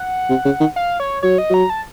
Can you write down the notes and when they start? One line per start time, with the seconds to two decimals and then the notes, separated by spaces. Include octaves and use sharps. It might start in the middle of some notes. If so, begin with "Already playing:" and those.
Already playing: F#5
0.30 C3
0.45 C#3
0.60 D#3
0.76 F5
1.00 C#5
1.23 F#3 C#5
1.38 D#5
1.50 F#3 A#5
1.70 A5